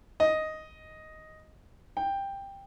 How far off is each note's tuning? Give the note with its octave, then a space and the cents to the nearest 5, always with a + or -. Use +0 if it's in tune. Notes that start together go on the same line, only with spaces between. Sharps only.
D#5 +5
G5 +10